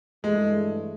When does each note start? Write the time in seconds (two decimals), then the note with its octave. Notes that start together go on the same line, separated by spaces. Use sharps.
0.24 G2 E3 G#3 A3